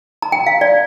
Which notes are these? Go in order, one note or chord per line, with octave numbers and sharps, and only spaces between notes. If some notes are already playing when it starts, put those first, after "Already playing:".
A#5
G5
F5
D5